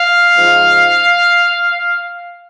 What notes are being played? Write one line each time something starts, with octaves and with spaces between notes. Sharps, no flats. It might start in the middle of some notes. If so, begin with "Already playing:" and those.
Already playing: F5
G#2 F3